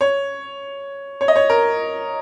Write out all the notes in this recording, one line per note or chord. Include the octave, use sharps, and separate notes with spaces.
C#5
C#5
D#5
C#5
A#4